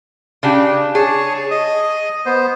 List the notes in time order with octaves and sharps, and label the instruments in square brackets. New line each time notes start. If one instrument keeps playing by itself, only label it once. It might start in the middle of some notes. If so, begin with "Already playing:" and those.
[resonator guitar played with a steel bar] C#3 D4 G4
[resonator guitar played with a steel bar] G#4 [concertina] C#5 A5
[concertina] D#5 D#6
B3 C5